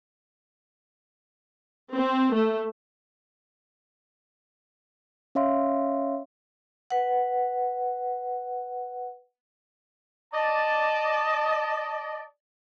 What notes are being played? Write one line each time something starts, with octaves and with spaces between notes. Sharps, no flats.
C4
A3
C#4 C#5 E5 F5 C6
B4 F#5
D5 D#5 A5